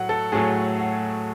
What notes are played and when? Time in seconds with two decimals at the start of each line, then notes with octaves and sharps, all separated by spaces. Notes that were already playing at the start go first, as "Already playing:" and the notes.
Already playing: A2 F#3 A3 F#5
0.09 A4
0.32 A2 F#3 A3 G#4
0.79 F#4